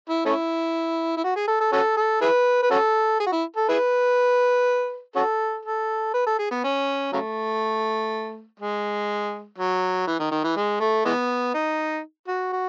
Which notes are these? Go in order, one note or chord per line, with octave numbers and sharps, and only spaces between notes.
E4
A3 C#4 E4
E4
F#4
G#4
A4
A4
C#4 F#4 A4
A4
E4 G#4 B4
B4
C#4 F#4 A4
G#4
F#4
E4
A4
E4 G#4 B4
C#4 F#4 A4
A4
B4
A4
G#4
B3
C#4
C#3 F#3 A3
G#3
F#3
E3
D#3
D#3
E3
G#3
A3
E3 G#3 B3
D#4
F#4
F#4